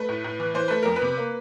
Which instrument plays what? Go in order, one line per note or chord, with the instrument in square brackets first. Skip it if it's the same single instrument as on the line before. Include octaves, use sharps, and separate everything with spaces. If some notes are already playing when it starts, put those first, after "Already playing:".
Already playing: [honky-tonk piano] A3 B4
A2
A2
E3
E3 C5
A3 B4
F2 A#4
B4
C3
A#3